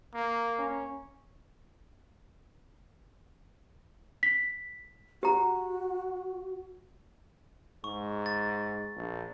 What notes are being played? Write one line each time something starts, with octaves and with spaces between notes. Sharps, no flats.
A#3
C#4
B6
F#4 G4 A#5
G#2 C#6
A6
A#1